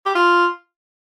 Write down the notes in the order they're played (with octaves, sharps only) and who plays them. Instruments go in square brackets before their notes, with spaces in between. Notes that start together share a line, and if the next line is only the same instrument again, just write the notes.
[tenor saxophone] G4
F4